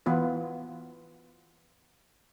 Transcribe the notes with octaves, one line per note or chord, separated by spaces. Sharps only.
E3 B3 F4 B4